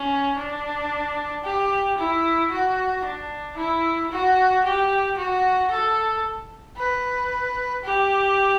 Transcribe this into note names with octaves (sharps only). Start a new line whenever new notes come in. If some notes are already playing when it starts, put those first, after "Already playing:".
Already playing: C#4
D4
G4
E4
F#4
D4
E4
F#4
G4
F#4
A4
B4
G4